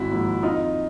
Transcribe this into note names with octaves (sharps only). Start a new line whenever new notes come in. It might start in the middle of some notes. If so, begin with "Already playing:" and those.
Already playing: G#1 E4 F#4
G#2 F3 A#3
F2 D#4 F4